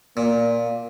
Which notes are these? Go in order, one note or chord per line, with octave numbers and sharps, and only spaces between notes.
A#2 A#3